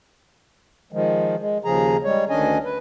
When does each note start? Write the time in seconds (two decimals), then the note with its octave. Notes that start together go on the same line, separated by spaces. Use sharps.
0.93 D#3 F3 G#3
1.40 G#3
1.65 D#2 C#3 F3 G#4 A#5
2.04 G3 G#3 C#5
2.29 D2 D#3 C#4 D4 D#5 G#5
2.64 B4